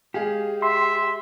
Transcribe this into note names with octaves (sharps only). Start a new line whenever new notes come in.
G#3 G4 G#4 F5
E5 C6